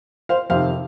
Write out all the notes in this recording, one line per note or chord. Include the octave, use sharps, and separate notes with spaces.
C5 F5
F2 C3 D#3 C5 F5